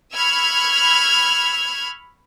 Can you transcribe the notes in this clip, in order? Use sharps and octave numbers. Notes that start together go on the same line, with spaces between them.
B5 C#6 E6 F6 G#6